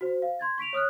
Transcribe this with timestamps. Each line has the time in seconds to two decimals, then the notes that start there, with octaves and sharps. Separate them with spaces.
0.01 F#4 C5
0.22 F5
0.39 C6 G#6 A6
0.58 C#6 B6 D7 F7
0.73 C#5 D#6 F6 F#6